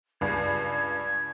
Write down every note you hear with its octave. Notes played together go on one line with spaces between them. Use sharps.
C#2 G2 G#6